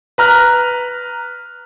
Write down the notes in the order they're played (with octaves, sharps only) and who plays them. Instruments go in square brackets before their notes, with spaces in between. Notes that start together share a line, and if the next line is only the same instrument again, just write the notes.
[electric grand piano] B4 A#5 F6 F#6